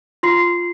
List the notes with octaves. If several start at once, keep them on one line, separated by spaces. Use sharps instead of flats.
F4 C6 C7